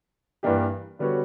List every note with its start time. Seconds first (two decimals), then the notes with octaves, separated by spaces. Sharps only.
0.43 G2 E3 A#3 D4 G4
0.99 D3 G3 B3 F#4 C#5